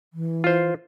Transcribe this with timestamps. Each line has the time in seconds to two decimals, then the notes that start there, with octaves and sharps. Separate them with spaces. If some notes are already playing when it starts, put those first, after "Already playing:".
0.13 E3
0.44 F4 C5